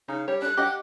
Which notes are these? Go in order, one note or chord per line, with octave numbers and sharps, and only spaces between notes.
C#3 D#4
G3 C#5
D4 A4 F#6
D4 G4 D#5 F#5